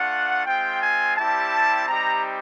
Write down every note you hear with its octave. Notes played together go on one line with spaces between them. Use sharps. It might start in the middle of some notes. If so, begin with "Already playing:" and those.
Already playing: A3 D4 F4 F#5
G#3 C4 F4 G5
G#5
G3 C4 E4 G4 A5
G3 C4 D#4 G4 A#5